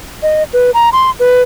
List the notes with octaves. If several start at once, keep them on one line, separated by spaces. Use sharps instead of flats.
D#5
B4
A#5
C6
B4